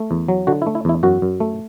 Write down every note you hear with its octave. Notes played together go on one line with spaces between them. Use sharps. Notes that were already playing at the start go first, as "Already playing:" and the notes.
Already playing: A3
E2
F#3
D3 F#4
E4
A3
E4
E2 E4
F#2 F#4
F#2
A3